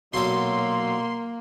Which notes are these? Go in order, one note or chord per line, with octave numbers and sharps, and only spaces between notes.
B1 A#2 F#3 A#3 A4 C6